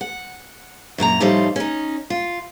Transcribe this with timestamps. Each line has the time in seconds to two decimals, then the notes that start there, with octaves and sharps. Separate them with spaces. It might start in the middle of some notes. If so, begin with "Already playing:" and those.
0.01 F#5
0.98 F#2 A#2 F#4 A#5
1.20 A2 F3 G3 D#4 F4 C5
1.56 C#4 D#4
2.10 F4